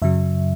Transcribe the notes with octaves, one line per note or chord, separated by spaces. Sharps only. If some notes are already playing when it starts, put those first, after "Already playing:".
F#2 C#3 F#3 E5